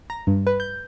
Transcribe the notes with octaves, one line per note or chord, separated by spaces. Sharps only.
A#5
G2
B4
G6